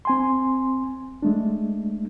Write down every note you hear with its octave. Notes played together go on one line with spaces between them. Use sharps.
C4 G#5 C6
G#3 A3 D4